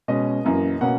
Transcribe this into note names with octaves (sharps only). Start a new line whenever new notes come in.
B2 G#3 C#4 D#5
F#2 E3 A#3
B2 A#3 C#4 F#5